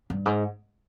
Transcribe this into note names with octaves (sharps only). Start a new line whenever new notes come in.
G2
G#2